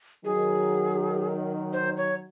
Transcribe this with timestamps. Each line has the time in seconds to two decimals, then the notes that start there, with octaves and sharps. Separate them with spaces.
0.25 D#3 F#3 G#4
1.73 C5
1.97 C#5